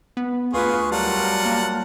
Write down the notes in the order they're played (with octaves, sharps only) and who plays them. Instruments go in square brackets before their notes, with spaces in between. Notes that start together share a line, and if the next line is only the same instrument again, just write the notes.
[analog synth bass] B3
[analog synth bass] D2 [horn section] F4 B4 [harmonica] G#4 C#6
[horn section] F#3 G3 A#4 [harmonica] F4 F#5 A5
[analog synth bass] A#3